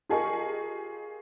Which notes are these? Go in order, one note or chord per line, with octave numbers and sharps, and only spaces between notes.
F4 G4 G#4 A#4 D#5 C#6